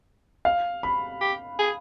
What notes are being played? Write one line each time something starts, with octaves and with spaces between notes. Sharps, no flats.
F5
B5
G4
G#4